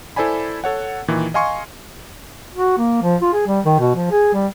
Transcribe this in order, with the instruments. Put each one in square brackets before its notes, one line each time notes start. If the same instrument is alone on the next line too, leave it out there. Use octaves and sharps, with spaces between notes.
[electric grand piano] E4 A4 C5 D5 G#5 B5
A4 C#5 F#5
A#2 D#3 E3
D#5 F5 G#5 C6 C#6
[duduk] F#4
A#3
F3
F4
G#4
G3
D#3
B2
F3
G#4
G3